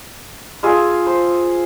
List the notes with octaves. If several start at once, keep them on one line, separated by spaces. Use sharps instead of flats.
F4 G#4 F5 E6
C5